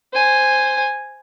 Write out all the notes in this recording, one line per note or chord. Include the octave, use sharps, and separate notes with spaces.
C5 G#5